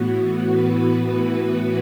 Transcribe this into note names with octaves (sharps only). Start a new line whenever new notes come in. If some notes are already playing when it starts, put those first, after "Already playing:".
Already playing: A2 E3 B3 F#4
B4